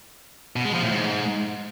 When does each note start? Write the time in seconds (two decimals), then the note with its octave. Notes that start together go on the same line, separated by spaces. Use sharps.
0.56 B2
0.65 G#3
0.74 F3
0.83 A2
0.92 G#2